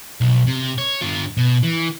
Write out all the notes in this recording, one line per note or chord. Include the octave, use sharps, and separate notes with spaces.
B1
C3
C#5
G2 F4
B2
E3